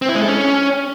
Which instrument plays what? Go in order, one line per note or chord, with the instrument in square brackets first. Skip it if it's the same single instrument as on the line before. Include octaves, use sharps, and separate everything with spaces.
[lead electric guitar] C4
E4
G#3
A4
C#4